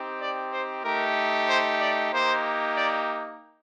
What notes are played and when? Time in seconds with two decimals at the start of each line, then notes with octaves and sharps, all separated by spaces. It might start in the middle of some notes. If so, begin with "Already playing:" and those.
Already playing: C4 D#4 G4
0.20 D5
0.52 C5
0.84 A3 D#4 G4 A#4
1.49 C5
1.80 D5
2.13 A#3 D#4 G4 C5
2.77 D5